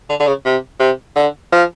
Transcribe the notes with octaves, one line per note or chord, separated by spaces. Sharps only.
D3
D3
C#3
C3
C3
D3
F3